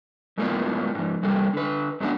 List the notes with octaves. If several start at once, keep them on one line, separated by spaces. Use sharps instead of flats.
F#2 A2 G#3 A#3 B3 F4
G#2 F3
C3 G3 A#3 A4
D3 B4
F#2 F#3 G#3 B3 D4 F#5